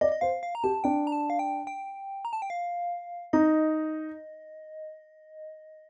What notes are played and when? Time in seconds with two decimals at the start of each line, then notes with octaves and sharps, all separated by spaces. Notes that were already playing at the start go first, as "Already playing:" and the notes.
0.01 D5 D#5
0.12 D#5
0.21 C5 F5
0.43 F5
0.55 A#5
0.64 G4 A5
0.84 D4 G5
1.07 A#5
1.12 A5
1.30 F5
1.39 G5
1.67 G5
2.25 A#5
2.33 A5
2.42 G5
2.50 F5
3.33 D#4 D#5